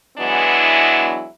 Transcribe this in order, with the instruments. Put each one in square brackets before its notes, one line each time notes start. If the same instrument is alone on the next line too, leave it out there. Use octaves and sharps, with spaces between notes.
[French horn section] E3 F#3 G#3 B3 D4 E4